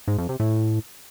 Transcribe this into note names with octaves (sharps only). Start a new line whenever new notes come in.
G#2
F2
C3
A2